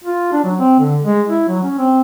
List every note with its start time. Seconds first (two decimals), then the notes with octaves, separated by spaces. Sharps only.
0.04 F4
0.33 D4
0.44 F#3
0.59 C4
0.80 D3
1.03 G#3
1.29 E4
1.49 F#3
1.63 C#4
1.78 C4